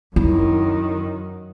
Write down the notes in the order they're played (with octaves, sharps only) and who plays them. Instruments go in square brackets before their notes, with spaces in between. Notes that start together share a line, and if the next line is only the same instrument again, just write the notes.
[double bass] F#2 D#3 [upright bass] E4